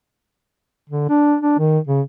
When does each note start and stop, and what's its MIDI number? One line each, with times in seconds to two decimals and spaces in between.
0.89 1.08 50
1.09 1.36 62
1.41 1.57 62
1.59 1.79 51
1.87 2.01 49